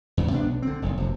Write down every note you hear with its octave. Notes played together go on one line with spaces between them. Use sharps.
E2 G#2 C#3
C3 B3 C4 D4
B1
D3 C4
F#1 B1 G2
F1 F#2 C3